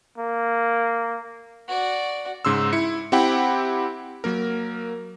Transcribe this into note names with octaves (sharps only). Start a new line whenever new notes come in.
A#3
F#4 D5
G#2 C#3 C6 E6
E4 C#7
C4 E4 G4 F#5 G5 B5
F#3 A#3 A#4